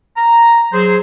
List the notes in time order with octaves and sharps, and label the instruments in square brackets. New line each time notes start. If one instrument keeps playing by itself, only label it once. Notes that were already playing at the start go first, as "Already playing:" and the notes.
[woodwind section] A#5
F#3 G#4 C5